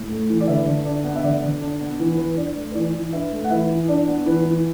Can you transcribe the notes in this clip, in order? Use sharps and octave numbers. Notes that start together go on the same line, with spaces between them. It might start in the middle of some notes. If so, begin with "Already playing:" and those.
Already playing: A2
A3
E3
D5
D3 B4 E5
D3
D4
B3
E5
D3 D5
D3
D4
B3
E3 B4
E3 B4
B4
D4 D5
A3
B4
E3 D5
E3
D4 B4 E5
A3
F#5
E3 B4 E5
E3
D4 D5
B3
E3 B4
E3